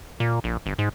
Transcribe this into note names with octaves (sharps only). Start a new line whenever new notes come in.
A#2
A#1
G1
G#2